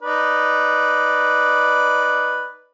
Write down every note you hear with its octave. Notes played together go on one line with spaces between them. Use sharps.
D#4 B4 D5